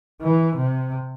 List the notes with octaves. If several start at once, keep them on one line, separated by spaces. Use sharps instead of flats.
E3
C3